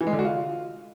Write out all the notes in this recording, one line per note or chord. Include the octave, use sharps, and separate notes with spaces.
E3
G#3
D3
F#4
F4